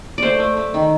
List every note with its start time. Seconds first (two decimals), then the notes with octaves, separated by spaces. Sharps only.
0.18 A3 C5 D5
0.40 A3
0.57 A3
0.74 D#3